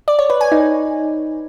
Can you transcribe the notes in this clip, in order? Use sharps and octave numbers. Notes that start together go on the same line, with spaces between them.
D5
C#5
B4
G#5
D#4